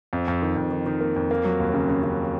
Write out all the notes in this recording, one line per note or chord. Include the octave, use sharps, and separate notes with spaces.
F2
F2
D#3
F2
D#3
D#3
A#3
F2
A#3
F#3
D#2
C#3
C#3
C#3